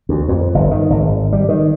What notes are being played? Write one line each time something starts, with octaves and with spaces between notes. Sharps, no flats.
D2
F2
G1
D#3
G#1
G3
D#3